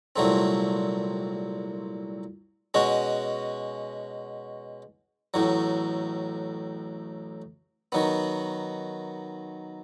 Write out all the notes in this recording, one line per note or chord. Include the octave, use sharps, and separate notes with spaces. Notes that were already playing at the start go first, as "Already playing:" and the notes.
C2 A#2 F#3 A3 C4
B2 G#3 C#4 F#4
A1 A2 F#3
D#3 F#3 B3